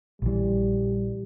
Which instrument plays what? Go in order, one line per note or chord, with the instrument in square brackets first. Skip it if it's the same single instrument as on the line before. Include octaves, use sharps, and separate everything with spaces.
[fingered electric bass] A#1 E3 [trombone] G3